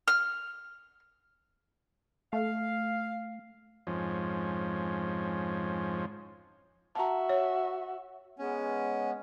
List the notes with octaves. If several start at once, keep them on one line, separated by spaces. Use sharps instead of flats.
F6
A3 F5
F2 G#2 F3 C#4
F#4 E5 A5 A#5
C#5
G#3 B3 C#4